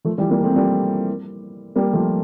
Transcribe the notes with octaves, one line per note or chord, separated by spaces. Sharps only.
F3 A3
E3 G3
G3 A#3
A3 C4
G3 A#3
G3 A#3
F3 A3